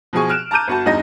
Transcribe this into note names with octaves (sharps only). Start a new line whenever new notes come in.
B2 F3 G#4 C#6
F6 F#6 D7 E7
A5 A#5 D6 G6 D#7
G1 F#4 A5
E2 G2 D#4 D#5 A#6